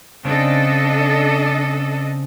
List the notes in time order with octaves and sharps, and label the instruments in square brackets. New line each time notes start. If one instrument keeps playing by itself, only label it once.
[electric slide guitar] C#3 C4 [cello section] D4 A4 D#5